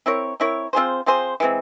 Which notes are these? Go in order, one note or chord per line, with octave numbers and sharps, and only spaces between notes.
C4 E4 A#4 C#5
C4 E4 A#4 C#5
C4 F4 G#4 C5
C4 F4 G#4 C5
E3 G#3 C4